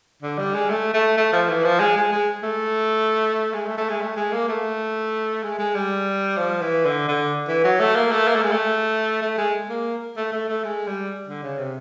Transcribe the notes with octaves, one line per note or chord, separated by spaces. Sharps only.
D3
G3
G#3
A3
A3
A3
F3
E3
F3
G#3
G#3
G#3
A3
G#3
A3
A3
G#3
A3
G#3
A#3
A3
G#3
G#3
G3
F3
E3
D3
D3
E3
F#3
A3
A#3
A3
A#3
A3
G#3
A3
A3
G#3
A#3
A3
A3
A3
G#3
G3
D3
C#3
C3